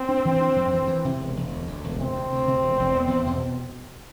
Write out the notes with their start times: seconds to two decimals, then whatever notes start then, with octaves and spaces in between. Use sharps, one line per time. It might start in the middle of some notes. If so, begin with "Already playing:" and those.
Already playing: C4
0.09 D4
0.25 E3
0.41 D4
0.56 F2
0.73 E3
0.88 E3
1.05 C3
1.21 E1
1.36 E1
1.52 D2
1.67 D2
1.84 E1
2.00 C3 C4
2.15 D2
2.32 D2
2.48 C3
2.63 E1
2.79 E1
2.96 B3
3.11 E2
3.26 B2